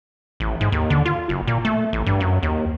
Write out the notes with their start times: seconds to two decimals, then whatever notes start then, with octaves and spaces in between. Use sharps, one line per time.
0.40 A1
0.61 G#2
0.72 D#2
0.90 D3
1.06 F4
1.29 F#1
1.47 A#2
1.65 A3
1.93 A1
2.06 G2
2.20 F#2
2.43 D#2